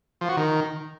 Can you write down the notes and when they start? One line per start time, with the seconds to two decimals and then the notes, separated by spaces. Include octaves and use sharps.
0.21 F3
0.29 F#4
0.37 D#3